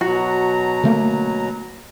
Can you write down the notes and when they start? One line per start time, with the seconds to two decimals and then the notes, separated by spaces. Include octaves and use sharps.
0.01 B2 F#3 F#4 A#5
0.84 D3 A3 A#3